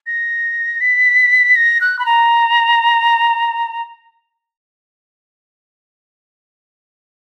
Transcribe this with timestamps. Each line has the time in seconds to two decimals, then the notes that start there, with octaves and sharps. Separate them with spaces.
0.07 A#6
0.81 B6
1.56 A#6
1.81 F#6
1.99 B5
2.06 A#5